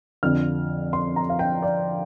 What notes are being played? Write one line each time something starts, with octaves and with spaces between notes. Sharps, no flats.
F2 D3 F3 F6
C6
A#5
F5
G5
D5